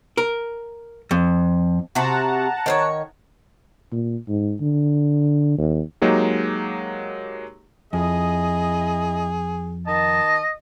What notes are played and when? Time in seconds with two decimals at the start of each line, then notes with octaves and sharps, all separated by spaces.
0.17 A#4
1.11 F2
1.95 C3 F#4 F#5 A5 A#5
2.66 D#3 C5 C#5
3.92 A#2
4.29 G#2
4.61 D3
5.58 D#2
6.02 F#3 G#3 A#3 D#4 G4
7.93 F2 E4 G#4 D#5
9.87 D#3 D#5 A5